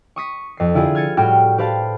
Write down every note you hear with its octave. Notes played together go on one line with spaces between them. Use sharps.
C#6 D#6 B6
F2 C7
D3 E4 F4 G4 G#4
F6 G#6 A6 C#7 D#7
A2 G3 F#4 G4 G5 F6
G4 B4 C5 F5 A5